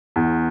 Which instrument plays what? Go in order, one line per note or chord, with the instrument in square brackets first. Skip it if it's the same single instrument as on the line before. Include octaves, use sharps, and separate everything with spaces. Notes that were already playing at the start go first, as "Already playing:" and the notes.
[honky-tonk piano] E2